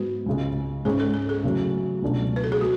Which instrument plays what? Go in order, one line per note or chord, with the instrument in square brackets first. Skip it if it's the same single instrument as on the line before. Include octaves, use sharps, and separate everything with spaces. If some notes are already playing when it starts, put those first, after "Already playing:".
Already playing: [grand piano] G#2 G#3 B3 [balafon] F#4
[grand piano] C#2 C#3 G#3
[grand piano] G#2 G#3 C#4 [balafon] G#4
[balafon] A4
A4
G#4
[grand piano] E2 C#3 F#3 A3
C#2 B2 F#3 A3 D4
[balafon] B4
A4
G#4
[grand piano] G#3 [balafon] F#4